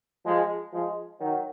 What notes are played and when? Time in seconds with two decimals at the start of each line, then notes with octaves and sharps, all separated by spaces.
0.25 F3 G#3
0.73 F3 G#3
1.20 D#3 F#3